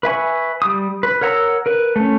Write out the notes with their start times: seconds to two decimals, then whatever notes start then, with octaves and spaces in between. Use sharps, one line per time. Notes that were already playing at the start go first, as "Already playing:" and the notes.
0.03 B4 E5 G#5 C#6
0.62 G3 D#6
1.03 B4
1.21 A#4 C#5 F#5 A#5 E6
1.66 A#4 B4
1.96 A3 C#4